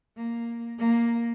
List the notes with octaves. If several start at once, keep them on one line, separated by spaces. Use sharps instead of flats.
A#3
A#3